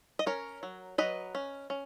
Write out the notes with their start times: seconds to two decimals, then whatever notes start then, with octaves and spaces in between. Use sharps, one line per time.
0.19 D#5
0.26 C#4 A#4 C#5
0.63 F#3
0.98 F#3 B4 D#5
1.35 C#4
1.70 C#4